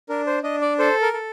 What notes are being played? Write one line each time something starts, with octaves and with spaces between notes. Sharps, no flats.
D4 A#4
C5
D4 D#5
D5
A4 C5
A#4
A4